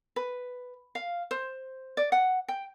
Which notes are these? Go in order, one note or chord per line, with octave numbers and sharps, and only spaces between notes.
B4
F5
C5
D5
F#5
G5